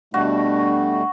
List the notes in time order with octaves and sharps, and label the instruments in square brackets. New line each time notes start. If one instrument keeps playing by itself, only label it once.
[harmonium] B2 G3 A3 [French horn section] D4 [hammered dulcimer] F#4